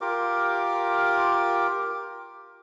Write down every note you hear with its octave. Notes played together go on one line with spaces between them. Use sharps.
F4 G4 A#4 D6